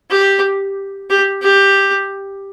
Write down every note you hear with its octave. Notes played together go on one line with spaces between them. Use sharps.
G4
G4
G4